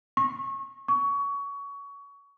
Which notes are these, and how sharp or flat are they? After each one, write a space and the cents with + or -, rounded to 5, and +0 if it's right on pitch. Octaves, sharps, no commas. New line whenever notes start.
C#6 -25
C#6 +25